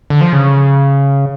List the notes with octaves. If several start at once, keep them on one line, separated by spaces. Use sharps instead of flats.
D3
F3
C#3